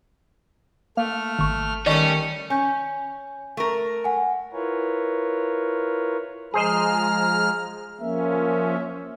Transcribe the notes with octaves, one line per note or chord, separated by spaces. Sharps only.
A3 A#3 F6
G#1 C#6
D#3 G3 A3 C#4 D5 D#5 C#6 D#6
C#4 G#5 G6
A3 A#4
F#5 G#5
E4 F4 A#4 B4 C#5
F3 G#3 G#4 C5 D#5 A#5 F6
F3 A#3 C#4 E5